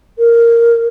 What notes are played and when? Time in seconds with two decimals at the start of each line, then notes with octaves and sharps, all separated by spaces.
0.19 A#4